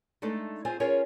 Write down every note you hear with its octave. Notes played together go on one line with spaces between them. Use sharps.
G#3 A3 D4 D#4 A4
C4 F4 G#4 C5 G#5
C#4 F4 G#4 A#4 C#5